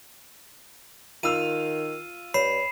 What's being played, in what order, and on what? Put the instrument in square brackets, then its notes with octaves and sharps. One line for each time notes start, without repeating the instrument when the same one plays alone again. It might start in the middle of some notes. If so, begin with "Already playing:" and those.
[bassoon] D#3 [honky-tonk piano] F4 E6 F7 [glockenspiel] D#7
[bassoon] G2 [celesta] C#5 [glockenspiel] B5 C7 E7